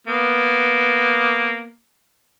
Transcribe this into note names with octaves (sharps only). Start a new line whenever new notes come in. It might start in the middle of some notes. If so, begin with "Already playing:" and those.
A#3 B3